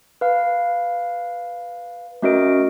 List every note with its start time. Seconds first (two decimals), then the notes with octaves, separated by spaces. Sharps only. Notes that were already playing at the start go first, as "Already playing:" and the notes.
0.21 B4 F5
2.22 A3 C#4 F#4 A#4 D#5 D7